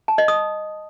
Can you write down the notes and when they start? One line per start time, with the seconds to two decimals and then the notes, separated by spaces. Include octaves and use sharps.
0.08 A5
0.18 D#5
0.28 D#6